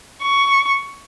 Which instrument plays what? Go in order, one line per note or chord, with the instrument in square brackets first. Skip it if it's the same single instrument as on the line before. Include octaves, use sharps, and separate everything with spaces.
[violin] C#6